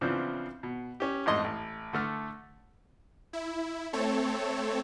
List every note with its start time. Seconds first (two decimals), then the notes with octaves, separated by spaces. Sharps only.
0.01 C#3 E3 F3 B3 C4 D4
0.63 B2
1.00 C#4 G4
1.26 A1 F2 G#2 D#5 C6
1.44 A1
1.93 D3 A3 F6
3.33 E4
3.93 A3 C4 A4 C#5